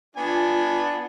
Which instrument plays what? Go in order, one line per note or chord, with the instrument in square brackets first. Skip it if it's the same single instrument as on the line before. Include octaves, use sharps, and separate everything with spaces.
[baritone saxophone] B3 [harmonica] D4 G#5 [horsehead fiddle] F4